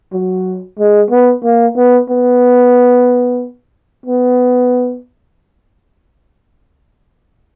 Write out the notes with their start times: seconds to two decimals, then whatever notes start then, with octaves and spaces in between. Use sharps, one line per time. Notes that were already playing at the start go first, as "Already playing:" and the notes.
0.13 F#3
0.79 G#3
1.11 B3
1.44 A#3
1.77 B3
2.09 B3
4.06 B3